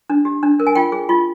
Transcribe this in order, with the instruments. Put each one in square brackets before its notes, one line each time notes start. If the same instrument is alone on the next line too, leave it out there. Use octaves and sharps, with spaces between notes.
[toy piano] D4
G4
D4
A#4
G#5
F4 G5
G#4
F4